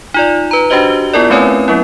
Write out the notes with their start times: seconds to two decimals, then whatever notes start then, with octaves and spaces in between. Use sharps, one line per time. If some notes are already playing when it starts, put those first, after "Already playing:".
0.14 D#4 F4 D5
0.51 B4 A#5
0.70 D4 F#4 G4 C5 D#5 G7
1.13 B3 E4 F4 A#4 D5
1.30 A3 C4 C#4 B4 C#5 G#5
1.68 F#3 B3 C#4 E4